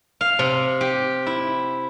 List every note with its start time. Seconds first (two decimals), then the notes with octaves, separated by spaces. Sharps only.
0.21 F5
0.39 C3
0.81 G4
1.26 E4